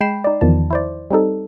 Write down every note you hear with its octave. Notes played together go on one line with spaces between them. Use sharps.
G#3 G5 B5 C7 E7
D#4 D5
E2 D#3 F3 A5
E4 C5 D5
G3 C4 D#4 A4